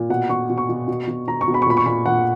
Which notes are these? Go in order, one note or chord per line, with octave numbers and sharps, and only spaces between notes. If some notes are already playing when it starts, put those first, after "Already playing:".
Already playing: A#2
B2 F#5
B2 C#6
B2
C#6
B2
B2
B2
B2 A#5
C#6
B2
B5
C#6
A#2 B5
C#6
A#2 B5
A#2 F#5